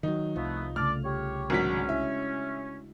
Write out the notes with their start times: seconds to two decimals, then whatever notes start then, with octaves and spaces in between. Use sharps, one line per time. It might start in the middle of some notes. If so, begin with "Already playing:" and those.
0.03 D#3 F3 F#3 D#4
0.36 C2 F3 A3 B3 F4
0.76 C#3 A3 D4 D5 F6
1.05 G4 C#5
1.50 G#1 F#3 G#3 C#4 D4 F#4 B6
1.89 E4 E5